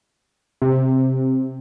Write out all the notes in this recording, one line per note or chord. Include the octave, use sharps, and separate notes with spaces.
C3